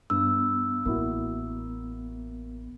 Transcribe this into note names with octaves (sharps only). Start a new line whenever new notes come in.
G2 B3 E6
A1 A#3 E4 F#4